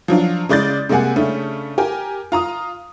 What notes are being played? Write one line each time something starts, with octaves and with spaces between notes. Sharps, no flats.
F3 F#3 D4 F4
C#3 G#3 D5 G6 A6
C3 G#3 A#3 F#5 G#5
C#3 A3 C#4 D4
G4 A#4 G#5
F4 A#5 D#6